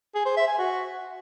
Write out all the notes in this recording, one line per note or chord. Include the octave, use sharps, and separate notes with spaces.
G#4
C5
E5
G#5
F#4